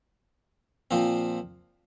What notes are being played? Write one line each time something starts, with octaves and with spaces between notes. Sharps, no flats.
A#2 F3 C4